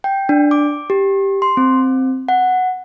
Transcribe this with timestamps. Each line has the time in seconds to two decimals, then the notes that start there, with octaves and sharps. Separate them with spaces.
0.04 G5
0.29 D4
0.51 D6
0.90 G4
1.42 C6
1.57 C4
2.28 F#5